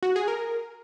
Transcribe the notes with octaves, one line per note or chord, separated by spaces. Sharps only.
F#4
G#4
A#4